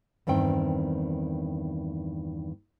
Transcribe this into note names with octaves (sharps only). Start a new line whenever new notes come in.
E2 G2 D#3 C4 G5